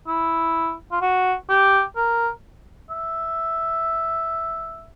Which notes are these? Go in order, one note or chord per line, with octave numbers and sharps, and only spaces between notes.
E4
F4
F#4
G4
A#4
E5